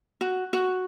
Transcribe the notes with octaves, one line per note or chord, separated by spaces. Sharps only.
F#4
F#4